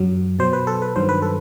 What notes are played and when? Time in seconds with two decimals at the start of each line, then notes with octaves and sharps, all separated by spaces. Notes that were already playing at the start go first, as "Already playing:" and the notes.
Already playing: F#2 F#3
0.39 B2 F#3 C5
0.53 B4
0.67 A4
0.82 B4
0.96 G2 D#3 F#3 C5
1.09 B4
1.22 A4